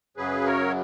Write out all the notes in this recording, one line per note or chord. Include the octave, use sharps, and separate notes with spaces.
F#2 C#3 F#3 G#4 B4
A#4 C#5